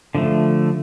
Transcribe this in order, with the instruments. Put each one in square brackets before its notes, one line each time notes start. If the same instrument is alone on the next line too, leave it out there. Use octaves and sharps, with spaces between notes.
[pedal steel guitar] D3 F3 A3